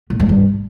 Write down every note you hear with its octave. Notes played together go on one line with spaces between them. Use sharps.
A#2
G#2
G2